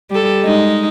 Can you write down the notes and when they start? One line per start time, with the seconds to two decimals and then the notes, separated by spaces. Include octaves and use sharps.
0.11 G3 A4
0.43 G#3 D#4